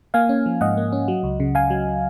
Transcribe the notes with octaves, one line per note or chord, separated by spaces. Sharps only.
A#3 F5 G#5
C#4
F3
G#2 D#5 F#5
A#3
C#4
F#3
C#2
C#3
C#2 F5 G#5
F#3